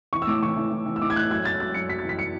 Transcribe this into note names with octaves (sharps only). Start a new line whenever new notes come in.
E3 C#6
E6
A2 D6
E3 C#6
E3
E3
E3
E6
A2 D6
G#6
A2 F#6
F#2 G#6
F#2 A6
F#2 A6
F#2 C#7
F#2 B6
A6
E3 B6
E3 C#7